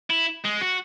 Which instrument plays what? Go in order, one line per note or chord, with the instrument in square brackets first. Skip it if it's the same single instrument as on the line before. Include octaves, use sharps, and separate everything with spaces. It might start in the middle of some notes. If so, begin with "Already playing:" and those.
[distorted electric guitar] E4
G#3
F#4